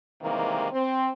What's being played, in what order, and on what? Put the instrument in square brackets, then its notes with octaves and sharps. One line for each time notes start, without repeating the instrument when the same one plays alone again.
[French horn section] C3 D#3 E3 G3 G#3 A#3
C4